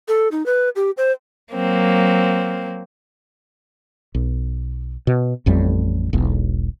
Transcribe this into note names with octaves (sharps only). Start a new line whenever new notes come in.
A4
D#4
B4
G4
C5
F#3 A#3 C4
B1
B2
A1 F2 A2 G3
E1 B1